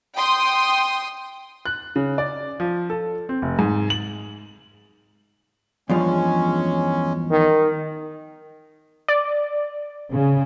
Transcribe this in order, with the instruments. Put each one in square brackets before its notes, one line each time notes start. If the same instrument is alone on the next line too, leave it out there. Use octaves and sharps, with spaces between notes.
[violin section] G5 C6 D#6
[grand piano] F#6
C#3
D5
F3
A4
C4
F1
G#2
F#7
[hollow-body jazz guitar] E2 G2 F3 [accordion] G#3 C#4
[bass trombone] D#3
[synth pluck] D5
[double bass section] C#3